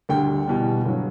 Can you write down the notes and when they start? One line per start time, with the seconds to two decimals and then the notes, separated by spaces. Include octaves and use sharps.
0.09 D2 D3 G3 G5
0.48 E2 B2 G3
0.85 G1 F#3